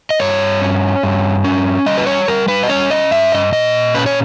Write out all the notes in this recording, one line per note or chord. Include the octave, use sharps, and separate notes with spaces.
D#5
G2 C#5
C#4
G2
C#4
G3 D#5
B4
C#5
G3 A#4
B4
D#5
C#4 C#5
D#5
G2 E5
D#5
A#2 D#5
C#4 B4
C#5